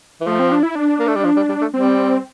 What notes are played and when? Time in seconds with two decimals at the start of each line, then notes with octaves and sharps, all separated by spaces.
0.21 E3
0.27 F3 A3
0.39 C4
0.52 D4
0.63 E4
0.75 D4
0.99 A#3
1.08 A3
1.16 G3
1.25 F3
1.37 G3
1.49 G3
1.62 A3
1.74 G3 C4